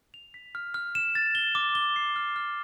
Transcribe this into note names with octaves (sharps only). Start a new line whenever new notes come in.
F7
B6
F6
F6
E7
A6
G7
D6
G7
C7
F6
F6